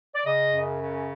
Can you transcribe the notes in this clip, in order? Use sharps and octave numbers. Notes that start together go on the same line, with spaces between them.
D5
C#3 D#5
F#2
C#3